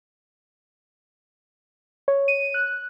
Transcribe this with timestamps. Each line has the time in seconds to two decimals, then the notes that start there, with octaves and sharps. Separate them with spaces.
2.08 C#5
2.28 D#7
2.54 F#6